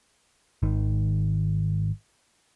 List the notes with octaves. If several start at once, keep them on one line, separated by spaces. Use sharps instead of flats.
G#1 D#3